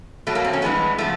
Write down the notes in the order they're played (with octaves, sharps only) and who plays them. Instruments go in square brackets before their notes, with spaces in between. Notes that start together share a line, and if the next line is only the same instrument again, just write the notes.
[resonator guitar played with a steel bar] B2 F#3 A3
A#3
C4
C#4
G2 E3 G#3 B3
C#3 F3 A3